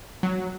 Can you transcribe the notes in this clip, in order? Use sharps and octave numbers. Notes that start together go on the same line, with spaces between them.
F#3